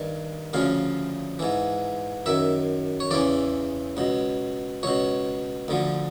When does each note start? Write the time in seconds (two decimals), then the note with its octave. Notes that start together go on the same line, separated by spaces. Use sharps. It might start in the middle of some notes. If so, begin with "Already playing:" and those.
Already playing: G2 D#3
0.53 D2 C#3 F3 F5
1.39 G#2 E3
2.26 F#2 D#3 E5
3.00 C#5
3.11 E2 C#3 E3 D5
3.97 C#2 B2
4.83 C#2 B2 C#5
5.68 D2 D3 F3